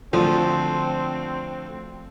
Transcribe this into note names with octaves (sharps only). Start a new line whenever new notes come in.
D2 D3 F3 C4